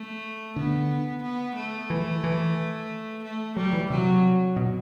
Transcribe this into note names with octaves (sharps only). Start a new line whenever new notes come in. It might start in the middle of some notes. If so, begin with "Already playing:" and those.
Already playing: A3
D3 B3
B3
A3
E3
E3
A3
F#3 G3
E3
C3 F#3
B2